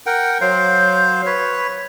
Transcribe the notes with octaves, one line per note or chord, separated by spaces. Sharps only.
A#4 F#5 G5
F#3 C5 F5
B4 C#5